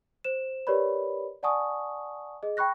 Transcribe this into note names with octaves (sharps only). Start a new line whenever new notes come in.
C5 E7
G4 A#4 B4 C#5 D5 B5
D5 F#5 G#5 A5 C#6 D#6
G#4 D#5
G5 B5 C#6 F#6 A#6